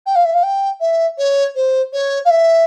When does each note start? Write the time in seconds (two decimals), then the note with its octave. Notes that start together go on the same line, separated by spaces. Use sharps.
0.06 G5
0.15 F5
0.25 E5
0.34 F5
0.43 G5
0.80 E5
1.18 C#5
1.55 C5
1.93 C#5
2.25 F5
2.30 E5